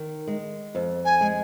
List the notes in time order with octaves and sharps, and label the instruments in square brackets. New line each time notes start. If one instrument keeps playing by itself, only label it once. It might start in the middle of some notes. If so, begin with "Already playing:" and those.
Already playing: [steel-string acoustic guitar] D#3
G#3
F2
[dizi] G#5
[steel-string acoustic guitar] G#3